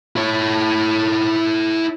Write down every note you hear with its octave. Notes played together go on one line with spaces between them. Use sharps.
E4 C#5